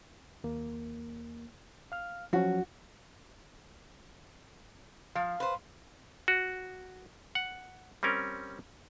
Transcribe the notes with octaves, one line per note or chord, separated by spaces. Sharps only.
D#2 A#3
F5 F6
F3 F#3 C#4 F#4
F3 F5
B4 C5
F#4
F#5
G3 C4 C#4 A#4